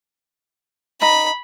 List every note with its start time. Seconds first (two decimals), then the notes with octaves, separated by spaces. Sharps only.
1.02 D#4 A#5 B5